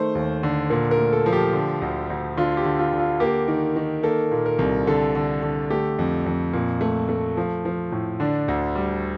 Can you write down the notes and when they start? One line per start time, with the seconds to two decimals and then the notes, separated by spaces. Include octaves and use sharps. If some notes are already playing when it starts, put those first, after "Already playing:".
Already playing: D#3 A3 C5
0.15 D#2
0.43 D3
0.70 A#2 A#4
0.91 A#4
0.98 A3
1.13 A4
1.26 F3
1.33 G4
1.53 D3
1.82 D2
2.10 D2
2.37 D3 F4
2.57 G4
2.65 D3
2.79 F4
2.93 D3
2.99 F4
3.20 A#3 G4
3.48 D#3
3.76 D#3
4.03 A#3 A4
4.31 A#2
4.46 A#4
4.59 C2
4.87 D3 A4
5.15 D3
5.43 D3
5.70 A3 G4
5.99 F2
6.26 F2
6.53 A#2
6.81 A3
7.09 A3
7.37 F3
7.65 F3
7.92 A2
8.20 D3 D4
8.48 D2
8.76 G3